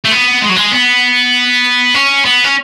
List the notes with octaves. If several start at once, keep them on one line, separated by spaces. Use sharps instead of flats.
A3
B3
G#3
F#3
G#3
B3
C#4
B3
C#4